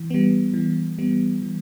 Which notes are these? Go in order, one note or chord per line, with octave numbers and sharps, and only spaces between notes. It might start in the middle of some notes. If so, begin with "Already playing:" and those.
Already playing: E3
G3 B3
E3
G3 B3
E3